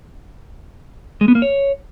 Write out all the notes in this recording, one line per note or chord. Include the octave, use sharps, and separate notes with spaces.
G#3
B3
A#3
C#5